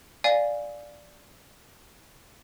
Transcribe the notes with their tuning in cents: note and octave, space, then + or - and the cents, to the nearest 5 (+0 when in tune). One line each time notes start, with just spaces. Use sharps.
D5 +0 F5 +0 G#5 +0